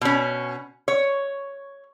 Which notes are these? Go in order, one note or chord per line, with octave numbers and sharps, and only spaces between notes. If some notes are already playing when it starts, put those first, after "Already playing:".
B2 C#4
C#5